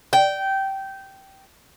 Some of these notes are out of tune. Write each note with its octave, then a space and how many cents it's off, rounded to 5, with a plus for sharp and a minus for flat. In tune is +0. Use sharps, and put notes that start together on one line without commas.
G5 -15